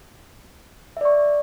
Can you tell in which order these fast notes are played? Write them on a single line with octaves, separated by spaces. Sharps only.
E5 D5 C#6